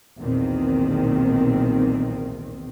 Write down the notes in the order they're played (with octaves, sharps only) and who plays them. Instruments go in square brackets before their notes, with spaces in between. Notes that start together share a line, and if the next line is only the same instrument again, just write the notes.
[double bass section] B1 E2 A#2 D#3 C4